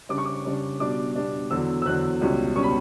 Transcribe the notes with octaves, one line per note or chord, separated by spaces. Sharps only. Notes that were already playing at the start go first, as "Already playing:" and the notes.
C#3 G3 D4 D6
C#6
D6
C#3 G3 D4
B2 G3 D4 D6
B2 G3 D4
E2 D3 F#3 E6
E6
E2 D3 F#3 F#6
C#2 B2 G3 C#4
B2 G3 C#4 C#6
B5